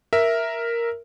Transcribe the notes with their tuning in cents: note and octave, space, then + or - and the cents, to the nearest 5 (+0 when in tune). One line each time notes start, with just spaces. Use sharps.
A#4 +0 E5 +0